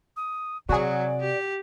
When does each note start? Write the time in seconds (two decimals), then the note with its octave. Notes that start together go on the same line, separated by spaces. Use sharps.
0.17 D#6
0.69 C3 F#3 F#4 G#4 D5
1.21 G4